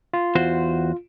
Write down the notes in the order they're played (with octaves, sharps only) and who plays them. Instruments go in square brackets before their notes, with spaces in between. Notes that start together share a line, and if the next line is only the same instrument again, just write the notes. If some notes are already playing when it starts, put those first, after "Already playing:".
[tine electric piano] F4
[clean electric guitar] E2 F#4 C5